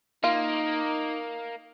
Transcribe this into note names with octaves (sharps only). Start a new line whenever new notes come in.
A#3 D#4 F4